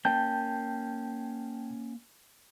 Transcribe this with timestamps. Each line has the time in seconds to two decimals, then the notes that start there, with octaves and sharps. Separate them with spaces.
0.05 A#3 C#4 G5 A5 G6